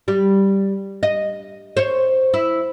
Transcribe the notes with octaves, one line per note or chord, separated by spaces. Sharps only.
G3
D#5
C5 C#5
E4